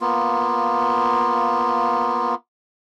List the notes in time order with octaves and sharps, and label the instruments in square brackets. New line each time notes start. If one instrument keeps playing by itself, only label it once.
[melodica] A#3 B3 F4